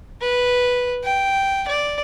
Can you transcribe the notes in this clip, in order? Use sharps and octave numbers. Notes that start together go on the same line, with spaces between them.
B4
G5
D5